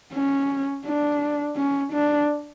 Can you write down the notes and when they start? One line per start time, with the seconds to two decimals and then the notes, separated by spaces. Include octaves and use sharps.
0.13 C#4
0.85 D4
1.56 C#4
1.92 D4